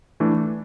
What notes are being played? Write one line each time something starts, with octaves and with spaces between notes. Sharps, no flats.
E3 A3 D4